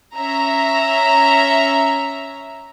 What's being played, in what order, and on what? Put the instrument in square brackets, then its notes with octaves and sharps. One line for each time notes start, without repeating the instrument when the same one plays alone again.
[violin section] C#4 E5 A#5